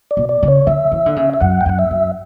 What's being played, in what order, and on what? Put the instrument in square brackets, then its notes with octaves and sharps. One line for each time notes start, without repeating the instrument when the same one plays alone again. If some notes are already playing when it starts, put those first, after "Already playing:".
[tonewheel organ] D5
[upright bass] B2
[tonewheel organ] D5
[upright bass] C#3
[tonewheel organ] C#5
[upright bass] D3 [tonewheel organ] E5
[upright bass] E3
D3
C#3
[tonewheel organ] E5
[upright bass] F#2 [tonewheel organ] F#5
[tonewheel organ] G5
[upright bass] F#2 [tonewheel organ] F#5
[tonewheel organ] E5
[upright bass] F#2